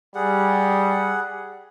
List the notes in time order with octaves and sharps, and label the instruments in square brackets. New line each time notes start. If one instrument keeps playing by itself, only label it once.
[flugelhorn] G3 [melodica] G#4 F#5